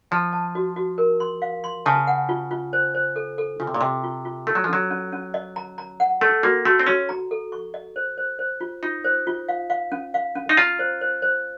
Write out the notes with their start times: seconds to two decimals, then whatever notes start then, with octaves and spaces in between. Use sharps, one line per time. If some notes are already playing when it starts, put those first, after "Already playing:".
0.11 F3 A5
0.33 A5
0.55 F#4
0.76 F#4
0.98 A#4
1.20 C6
1.42 F5
1.64 C6
1.86 C#3 A5
2.07 F#5
2.29 F4
2.51 F4
2.73 C5
2.95 C5
3.16 A4
3.38 A4
3.60 C#3 F4
3.67 C3
3.74 A#2
3.81 C3 D#5
4.03 F4
4.25 F4
4.47 A3 A4
4.55 F#3
4.64 F3
4.69 F#3 C#4
4.91 C#4
5.12 C#4
5.34 D#5
5.56 A#5
5.78 A#5
6.00 F#5
6.21 A3 A4
6.43 A#3 F#4
6.65 A3 F#4
6.80 C4
6.87 C#4 F#4
7.09 A#5
7.31 A4
7.52 C#6
7.74 D#5
7.96 C5
8.18 C5
8.39 C5
8.61 F4
8.83 D#4 F4
9.04 C5
9.27 F4
9.48 F5
9.70 F5
9.92 C#4
10.14 F5
10.35 C#4
10.49 D#4
10.57 F4 A#5
10.79 C5
11.01 C5
11.22 C5